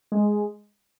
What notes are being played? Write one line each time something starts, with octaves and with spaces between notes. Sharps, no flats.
G#3